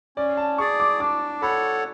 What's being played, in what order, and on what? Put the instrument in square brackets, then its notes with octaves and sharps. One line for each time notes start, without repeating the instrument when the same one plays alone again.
[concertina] C#4 [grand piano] D5
[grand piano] A5
[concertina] G#4 D5 [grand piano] C#6
[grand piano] D6
[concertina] D4 [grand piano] D6
[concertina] A4 C#5 F#5 [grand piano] B5